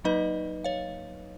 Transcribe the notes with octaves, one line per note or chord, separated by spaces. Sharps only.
F#3 A#3 D#4 B4 D#5
C#5 F5